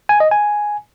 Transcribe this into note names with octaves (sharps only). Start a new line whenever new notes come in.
G#5
D#5
G#5